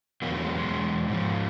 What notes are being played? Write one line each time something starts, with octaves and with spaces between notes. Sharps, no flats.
E2 B2 F#3 A#3
A3
G#3
G#3
G#2 F3